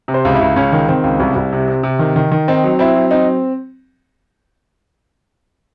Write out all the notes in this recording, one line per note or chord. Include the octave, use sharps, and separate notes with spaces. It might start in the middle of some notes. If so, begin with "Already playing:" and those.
C3
C5
C#2
E4
C#2
C#2 C#4
D#3
D#3 C4
C#2
C2
C2
C3
C3
C3
D#3
D#3
D#3
C4 D#4
F#3
C4 E4
F#3
C4 D#4